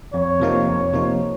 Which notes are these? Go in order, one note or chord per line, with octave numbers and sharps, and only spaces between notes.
F2 C#5
C3 F3 A#3 D#4
F2
C3 F3 A#3 D#4